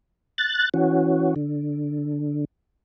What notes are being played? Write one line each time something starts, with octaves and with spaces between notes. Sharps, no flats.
F#6 A6
E3 C#4 F#4
D3